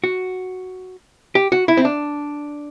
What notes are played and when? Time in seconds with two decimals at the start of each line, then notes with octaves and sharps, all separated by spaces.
0.04 F#4
1.35 G4
1.52 F#4
1.68 E4
1.77 C4
1.85 D4